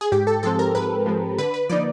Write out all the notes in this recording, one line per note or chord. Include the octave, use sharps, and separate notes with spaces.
G#4
G#2 G4
A4
F3 G#3 C4 A4
A#4
G#2 B4
F3 G#3 C4
D3 B4
B4
F3 A#3 D#4 D5